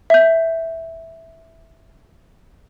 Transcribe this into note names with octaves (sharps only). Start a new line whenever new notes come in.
E5 G6